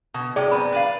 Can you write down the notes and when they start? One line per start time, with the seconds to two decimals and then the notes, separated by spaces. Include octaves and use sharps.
0.14 B2
0.36 A2 C3 G#4 D5 G5
0.51 F#2 B3 C4 B5
0.73 B4 D5 F5